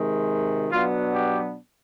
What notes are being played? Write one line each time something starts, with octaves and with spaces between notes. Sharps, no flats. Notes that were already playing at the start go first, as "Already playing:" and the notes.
Already playing: C3 D#3 G#3
B2 F#3 B3 D4 F4
G4